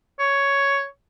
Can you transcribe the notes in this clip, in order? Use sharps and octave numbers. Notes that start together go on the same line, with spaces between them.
C#5